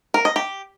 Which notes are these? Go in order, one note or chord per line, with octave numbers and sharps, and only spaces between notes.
A#4
D#5
G4